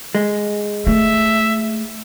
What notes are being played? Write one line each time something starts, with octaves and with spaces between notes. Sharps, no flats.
G#3
A3 E5